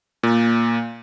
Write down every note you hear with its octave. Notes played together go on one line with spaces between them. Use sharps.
A#2